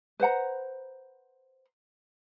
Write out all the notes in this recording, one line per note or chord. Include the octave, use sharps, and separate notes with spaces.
B4 C5 F#5 A#5